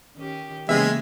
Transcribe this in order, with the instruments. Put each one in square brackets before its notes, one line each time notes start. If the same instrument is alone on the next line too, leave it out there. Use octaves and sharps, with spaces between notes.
[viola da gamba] D#3 C#4 G4
[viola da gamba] C#3 A#3 [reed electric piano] E3 B3 G4 [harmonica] G#3 [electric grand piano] E5